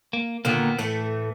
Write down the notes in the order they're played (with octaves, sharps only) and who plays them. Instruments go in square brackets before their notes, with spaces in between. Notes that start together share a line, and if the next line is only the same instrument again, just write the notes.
[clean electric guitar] A#3
[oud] A#2 D3 D#3 [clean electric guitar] A#3 B3
[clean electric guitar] A2 [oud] E3 A3